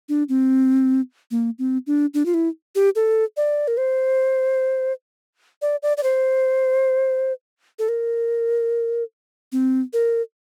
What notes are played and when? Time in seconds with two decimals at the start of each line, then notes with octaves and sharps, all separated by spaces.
0.09 D4
0.29 C4
1.31 A#3
1.59 C4
1.87 D4
2.14 D4
2.26 F4
2.34 E4
2.75 G4
2.96 A4
3.37 D5
3.68 A#4
3.77 C5
5.62 D5
5.83 D5
5.97 D5
6.03 C5
7.79 A4
7.89 A#4
9.52 C4
9.93 A#4